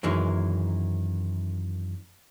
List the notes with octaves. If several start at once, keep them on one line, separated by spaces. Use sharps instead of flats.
F#2 D#3 E3 G#3